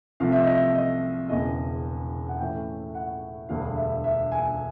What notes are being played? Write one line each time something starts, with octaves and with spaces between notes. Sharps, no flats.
C2 C3 F3 A3 F5
E5
D#5
E5
D#5
E1 E2 C#3 D#5
F#5
A2 E3 A3 C#4 G5
F#5
E1 D2 D3 G3 F5
E5
E5
G#5